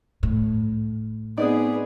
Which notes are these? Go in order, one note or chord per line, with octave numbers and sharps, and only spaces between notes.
A2
B3 C4 D#4 G#4 D5 D#6